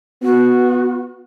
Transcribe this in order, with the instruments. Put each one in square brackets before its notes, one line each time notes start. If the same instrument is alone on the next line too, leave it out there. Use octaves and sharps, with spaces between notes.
[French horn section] B3 [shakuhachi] F#4